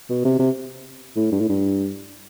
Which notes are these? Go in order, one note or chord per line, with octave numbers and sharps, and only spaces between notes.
B2
C3
C3
A2
G2
A2
G2